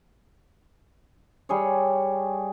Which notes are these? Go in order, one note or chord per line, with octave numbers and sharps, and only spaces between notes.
G3 G#4 C#5